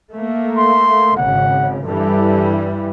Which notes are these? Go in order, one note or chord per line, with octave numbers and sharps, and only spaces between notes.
A3 A#3
C6
G#1 C#3 F#5
G2 E3 G3 A4